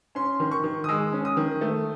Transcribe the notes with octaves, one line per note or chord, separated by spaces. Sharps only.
C#4 C6
D#3
C#6
D#3
D#6
G#3 E6
C#4
D#6
D#3
A3